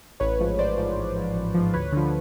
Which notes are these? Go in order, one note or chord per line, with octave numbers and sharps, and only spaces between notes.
A1 B4 C#5
G#2 F3
A1 C5 D5
G#2 F3
A1
G#2 F3
A1
G#2 F3
D2 B4 C#5
D3 F3